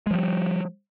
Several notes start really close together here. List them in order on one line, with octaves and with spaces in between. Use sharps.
G#3 F3 G3